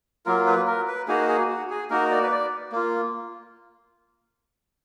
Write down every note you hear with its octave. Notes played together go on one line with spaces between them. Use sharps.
F#3 A#3 F4 A#4
B4
A#4
B4
A#3 D#4 F#4 G#4
G#4
F#4
G#4
A#3 D#4 F#4 A#4
D5
B4
D5
A#3 F4